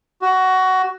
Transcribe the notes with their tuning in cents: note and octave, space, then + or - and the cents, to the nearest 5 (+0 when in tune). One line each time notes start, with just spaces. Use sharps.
F#4 +15